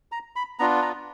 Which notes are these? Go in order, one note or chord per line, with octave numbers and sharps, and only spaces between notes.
A#5
B5
B3 D4 F4 A#5
A#5